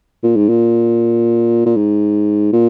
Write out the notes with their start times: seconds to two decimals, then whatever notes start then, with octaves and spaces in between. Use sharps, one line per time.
0.23 A#2
0.36 G#2
0.49 A#2
1.66 A#2
1.77 G#2
2.53 A#2